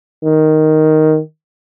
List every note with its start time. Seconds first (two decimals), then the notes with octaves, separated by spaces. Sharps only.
0.24 D#3